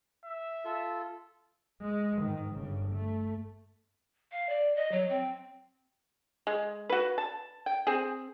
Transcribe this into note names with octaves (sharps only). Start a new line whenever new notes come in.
E5
F4 A4
G#3
G#2 D#3
G1 C#3
A3
F5
D5
D#5
F#3
C4
G#3
F#4 B4
A5
G5
C4 G#4